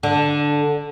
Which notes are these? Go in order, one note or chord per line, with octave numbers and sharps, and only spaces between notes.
D3